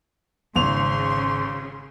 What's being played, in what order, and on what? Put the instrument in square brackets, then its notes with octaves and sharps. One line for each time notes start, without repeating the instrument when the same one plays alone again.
[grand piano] G#1 F7 [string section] C#3 [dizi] C6